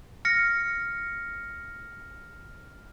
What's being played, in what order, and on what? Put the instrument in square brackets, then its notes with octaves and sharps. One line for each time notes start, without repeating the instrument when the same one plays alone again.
[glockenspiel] F6 A#6 C#7